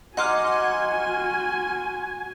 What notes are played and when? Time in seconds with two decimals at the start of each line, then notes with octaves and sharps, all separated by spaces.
0.17 D#4 F#4 D#5 F#5 G#5 C6 D6 F6